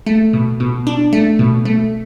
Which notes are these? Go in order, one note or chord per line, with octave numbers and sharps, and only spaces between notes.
A3
B2
B2
D4
A3
B2
A3